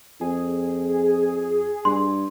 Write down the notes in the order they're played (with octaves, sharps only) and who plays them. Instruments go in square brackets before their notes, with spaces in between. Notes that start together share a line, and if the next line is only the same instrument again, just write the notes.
[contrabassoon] F2 [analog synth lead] G#4
[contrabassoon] G2 [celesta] C6